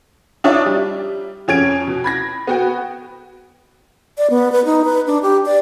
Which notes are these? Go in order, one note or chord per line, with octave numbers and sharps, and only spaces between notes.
D4 D#4 F4 C#5 D5 E5
G3
F2 C#4 G#6 D7
B2
B5 G#6 A#6
B3 F#4 G5
D5
B3
B4
D#4
B4
D4
G4
D5